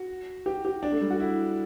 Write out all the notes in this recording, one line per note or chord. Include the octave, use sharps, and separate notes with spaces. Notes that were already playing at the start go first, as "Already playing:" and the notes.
Already playing: F#4
G4
G4
D4
A3
G3
F#4
E4